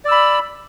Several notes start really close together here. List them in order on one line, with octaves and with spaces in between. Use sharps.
D5 E6 B5